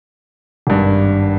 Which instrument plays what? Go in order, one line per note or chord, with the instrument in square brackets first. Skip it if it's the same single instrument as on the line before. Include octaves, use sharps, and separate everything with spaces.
[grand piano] G#1 G2